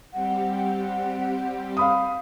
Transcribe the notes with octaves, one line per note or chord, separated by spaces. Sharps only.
G3 C4 G4 F#5
F5 B5 D#6